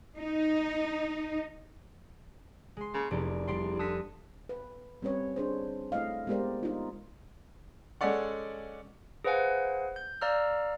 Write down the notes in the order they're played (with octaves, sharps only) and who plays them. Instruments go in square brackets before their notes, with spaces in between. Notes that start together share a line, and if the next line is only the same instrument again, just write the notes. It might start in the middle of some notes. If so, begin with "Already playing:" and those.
[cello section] D#4
[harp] G#3 C6
[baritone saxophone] C#3 [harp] A#3
[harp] F1 D5 [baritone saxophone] E2
[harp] G3 D5 C6
[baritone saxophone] D3 [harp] D#6 A#6 B6
[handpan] B4
G3 C4 C#4 B4 C#5
D4 G#4 C5
A3 E4 D#5 F5
G#3 B3 G4 A#4 C5 D5
D#4 F4
[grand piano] G#3 C#4 A4 D5 F#5
[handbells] G#4 B4 C5 F5 F#5 G#5
G6
D5 F5 A#5 E6 F6